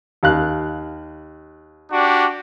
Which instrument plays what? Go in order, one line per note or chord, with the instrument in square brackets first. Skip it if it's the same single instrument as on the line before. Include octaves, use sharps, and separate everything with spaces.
[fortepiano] D#2 F5 F#6
[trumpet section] D4 F#4 G4